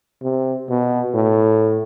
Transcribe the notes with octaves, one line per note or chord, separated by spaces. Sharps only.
C3
B2
A2